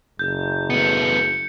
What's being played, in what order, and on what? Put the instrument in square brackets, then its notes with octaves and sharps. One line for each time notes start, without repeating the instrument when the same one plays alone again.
[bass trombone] F#1 [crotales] G6
[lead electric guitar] A3 B3 [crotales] C#7